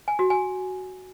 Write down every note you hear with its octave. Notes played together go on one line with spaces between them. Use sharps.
G#5
F#4
G#5